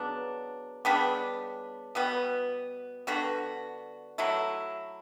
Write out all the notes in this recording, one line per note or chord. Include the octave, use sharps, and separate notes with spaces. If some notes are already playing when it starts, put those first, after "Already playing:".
Already playing: C#3 F#3 B3 D4
C#3 G3 B3 D4
B2 G3 B3
D3 G3 B3 F#4
F#3 A3 E4